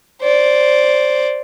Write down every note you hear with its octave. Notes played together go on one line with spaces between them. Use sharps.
C5 D5